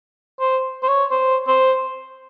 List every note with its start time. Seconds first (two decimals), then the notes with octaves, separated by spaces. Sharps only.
0.40 C5
0.83 C5
0.88 C#5
1.11 C5
1.48 C5